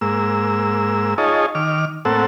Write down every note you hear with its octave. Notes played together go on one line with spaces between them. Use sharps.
G#2 A#3 E6
D#4 F4 G#4 C#5 D#5 A5
D#3 D6 F6
A2 A#3 C4 A4 F#5 E6